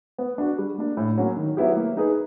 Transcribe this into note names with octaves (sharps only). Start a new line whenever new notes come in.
B3
D4 F#4
G3
A#3 D4
A2
F#3 A#3 C#4
D#3
F#3 B3 E4 G4
A#3
D#4 G#4 B4